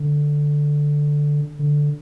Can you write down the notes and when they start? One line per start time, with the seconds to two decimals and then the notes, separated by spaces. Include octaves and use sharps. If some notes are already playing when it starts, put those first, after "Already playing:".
Already playing: D3
1.59 D3